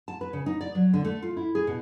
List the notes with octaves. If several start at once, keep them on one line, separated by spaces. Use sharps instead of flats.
A5
B4
C#3
D#4
D5
F#3
D3
A3
F4
E4
G#4
B2